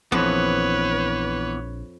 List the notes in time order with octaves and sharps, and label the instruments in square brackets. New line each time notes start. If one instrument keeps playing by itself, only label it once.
[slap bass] A#1 [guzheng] F2 [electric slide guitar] E3 B3 [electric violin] B4 C#5